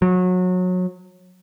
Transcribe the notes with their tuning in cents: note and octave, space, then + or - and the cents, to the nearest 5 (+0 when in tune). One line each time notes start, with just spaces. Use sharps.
F#3 -25